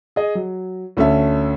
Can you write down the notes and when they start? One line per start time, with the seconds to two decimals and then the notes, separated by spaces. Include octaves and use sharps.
0.16 G#4 D#5
0.35 F#3
0.97 D2 C#4 A4 E5